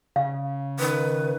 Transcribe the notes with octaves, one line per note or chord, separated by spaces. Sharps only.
C#3 F5
D#3 B4